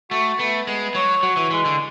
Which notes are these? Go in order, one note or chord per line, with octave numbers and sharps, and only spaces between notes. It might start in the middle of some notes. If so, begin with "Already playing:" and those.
A3 F#4
A3 B3
G#3 B3
F#3 C#5
F#3 F#4
E3
E3 G#3
D3